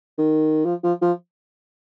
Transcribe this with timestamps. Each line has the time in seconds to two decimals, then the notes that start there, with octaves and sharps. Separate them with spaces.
0.18 D#3
0.65 F3
0.83 F3
1.02 F3